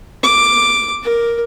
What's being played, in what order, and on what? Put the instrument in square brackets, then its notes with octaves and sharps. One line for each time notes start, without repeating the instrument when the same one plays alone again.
[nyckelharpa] D6
A#4